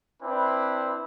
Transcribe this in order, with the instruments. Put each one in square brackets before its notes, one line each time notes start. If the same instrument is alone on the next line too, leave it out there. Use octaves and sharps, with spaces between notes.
[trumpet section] C4 D4 E4 B4